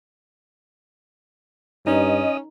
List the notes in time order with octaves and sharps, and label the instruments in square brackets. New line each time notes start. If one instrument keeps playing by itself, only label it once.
[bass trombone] G2 [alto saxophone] C#4 [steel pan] D#4 [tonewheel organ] D#5